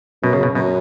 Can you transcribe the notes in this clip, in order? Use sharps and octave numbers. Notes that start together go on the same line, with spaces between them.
F#2 B2
C#3
B2
F#2 B2